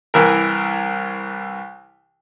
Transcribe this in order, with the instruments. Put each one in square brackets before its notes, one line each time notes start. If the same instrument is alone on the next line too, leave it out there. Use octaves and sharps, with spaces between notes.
[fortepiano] C2 E3 A#4